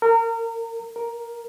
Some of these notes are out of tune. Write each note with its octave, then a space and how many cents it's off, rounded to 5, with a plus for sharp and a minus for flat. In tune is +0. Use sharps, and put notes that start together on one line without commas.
A#4 -30
A#4 +5